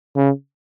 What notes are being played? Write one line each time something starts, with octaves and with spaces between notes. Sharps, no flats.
C#3